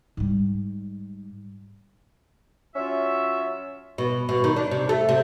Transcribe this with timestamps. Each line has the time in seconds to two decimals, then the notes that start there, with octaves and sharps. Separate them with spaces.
0.17 G#2 G3
2.75 F#3 C#4 F4 E5
3.98 B2
4.29 B2
4.44 D#3
4.56 D4
4.71 C3
4.89 A3
5.09 C3